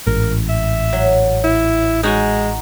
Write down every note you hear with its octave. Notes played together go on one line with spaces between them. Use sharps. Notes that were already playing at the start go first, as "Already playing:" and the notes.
A1 G#2 A#4
E5
F#3
E4
G#3 D#4 F#4 G#5